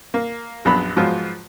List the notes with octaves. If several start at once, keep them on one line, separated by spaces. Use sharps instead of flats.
A#3
A#1 F#2 B3 D4 B5
G#2 F3 F#3 B3 F4